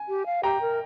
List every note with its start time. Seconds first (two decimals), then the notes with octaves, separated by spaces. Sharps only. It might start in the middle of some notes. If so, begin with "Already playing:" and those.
Already playing: G#5
0.08 G4
0.26 F5
0.43 G4 G5 A#5
0.61 A#4